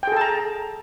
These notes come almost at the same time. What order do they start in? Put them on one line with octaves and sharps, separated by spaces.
G5 G#4 A4 A5 A#5